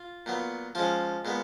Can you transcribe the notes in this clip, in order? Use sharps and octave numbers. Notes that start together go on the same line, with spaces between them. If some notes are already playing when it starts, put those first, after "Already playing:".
Already playing: F4
A#2 F#3 B3
F3 G#3 C#4 F4
A#2 G#3 B3